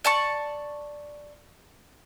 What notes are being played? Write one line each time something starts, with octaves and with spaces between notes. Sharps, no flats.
D5 A5 C#6